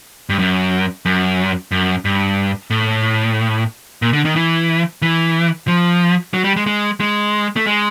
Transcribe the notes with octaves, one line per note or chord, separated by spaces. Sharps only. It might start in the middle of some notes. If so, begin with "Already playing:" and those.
G2
F#2
F#2
F#2
G2
A2
A#2
D3
D#3
E3
E3
F3
F#3
G3
G#3
G#3
G#3
A3
G#3